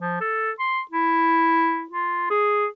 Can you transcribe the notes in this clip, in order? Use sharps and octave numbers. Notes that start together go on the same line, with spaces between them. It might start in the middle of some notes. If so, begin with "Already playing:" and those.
F3
A4
C6
E4
F4
G#4